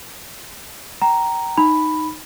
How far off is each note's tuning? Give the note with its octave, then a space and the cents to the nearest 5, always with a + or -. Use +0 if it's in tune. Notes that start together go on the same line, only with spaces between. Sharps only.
G5 -30 A#5 +0
D#4 -5 B5 +0